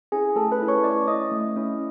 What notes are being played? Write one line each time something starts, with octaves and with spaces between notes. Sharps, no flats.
C#4 E4 G#4 G#5
A3 A4 A5
B4 B5
C#4 E4
C#5 C#6
A3 D5 D6
C#4 E4 D#5 D#6
A3
C#4 E4